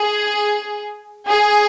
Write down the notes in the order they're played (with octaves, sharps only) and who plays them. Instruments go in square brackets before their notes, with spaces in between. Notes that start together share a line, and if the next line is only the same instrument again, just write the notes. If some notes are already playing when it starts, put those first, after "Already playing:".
Already playing: [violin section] G#4
G#4